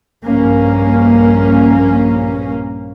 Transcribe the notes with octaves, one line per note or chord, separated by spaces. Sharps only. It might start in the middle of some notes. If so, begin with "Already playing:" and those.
A#1 G2 A#3 C#4